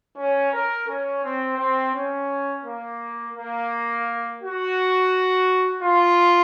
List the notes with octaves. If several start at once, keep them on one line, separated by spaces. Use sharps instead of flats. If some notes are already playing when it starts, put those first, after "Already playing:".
C#4
A#4
C#4
C4
C4
C#4
A#3
A#3
F#4
F4